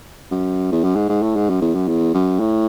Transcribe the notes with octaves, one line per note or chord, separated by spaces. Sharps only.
F#2
E2
F#2
G#2
G#2
A2
G#2
F#2
E2
F#2
E2
F#2
A2